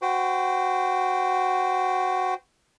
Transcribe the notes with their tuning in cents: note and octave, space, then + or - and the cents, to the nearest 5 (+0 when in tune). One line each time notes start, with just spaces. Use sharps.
F#4 +0 C5 -30 G5 -5